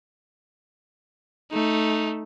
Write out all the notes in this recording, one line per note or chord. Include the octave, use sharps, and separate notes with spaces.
A3 D#4